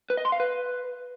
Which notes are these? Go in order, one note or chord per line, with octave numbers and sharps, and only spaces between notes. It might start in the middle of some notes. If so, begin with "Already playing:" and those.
B4
D#5
C6
F5
B4